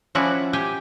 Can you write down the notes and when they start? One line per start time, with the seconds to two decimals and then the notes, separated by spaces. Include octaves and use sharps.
0.15 F3 C#4 E4 F#4 D5
0.53 G4 G5 G#5